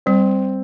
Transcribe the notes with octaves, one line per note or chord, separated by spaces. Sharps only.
G3 C4